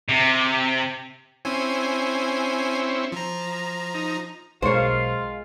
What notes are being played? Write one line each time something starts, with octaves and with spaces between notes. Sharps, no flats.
C3
C4 C#4 E4 G#5
F3 A#5
D#4
B1 B2 G#3 F4 A#4 C5 C#5 F5